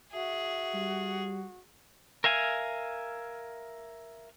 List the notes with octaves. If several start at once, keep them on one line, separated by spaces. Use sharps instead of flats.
F#4 G#4 E5
G3
A#4 E5 F5 G#5